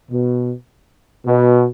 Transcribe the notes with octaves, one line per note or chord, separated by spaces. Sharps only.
B2
B2